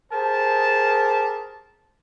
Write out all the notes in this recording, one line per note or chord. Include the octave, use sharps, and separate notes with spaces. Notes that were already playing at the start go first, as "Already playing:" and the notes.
G4 G#4 A#4 C5 A5